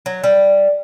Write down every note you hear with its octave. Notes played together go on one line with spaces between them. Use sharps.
F#3
G3